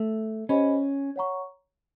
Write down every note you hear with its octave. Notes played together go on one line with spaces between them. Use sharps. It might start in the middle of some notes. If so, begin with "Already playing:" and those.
Already playing: A3
C#4 G4 C5 D#5 G#5 B5
C#5 F#5 A#5 C#6